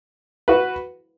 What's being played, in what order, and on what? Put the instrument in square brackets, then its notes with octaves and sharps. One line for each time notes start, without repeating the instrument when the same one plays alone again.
[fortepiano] F#4 B4